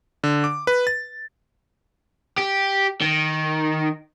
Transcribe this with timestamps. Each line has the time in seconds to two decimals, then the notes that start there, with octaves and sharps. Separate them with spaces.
0.24 D3
0.44 D6
0.67 B4
0.87 A6
2.38 G4
3.02 D#3